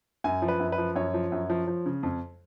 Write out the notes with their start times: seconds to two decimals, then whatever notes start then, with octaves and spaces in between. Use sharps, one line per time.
0.24 F#2 G#5
0.42 F3
0.48 B4
0.60 F#2
0.72 B4
0.78 F3
0.96 F#2 C#5
1.14 F3
1.32 F#2
1.50 F3
1.67 F3
1.86 C#3
2.03 F2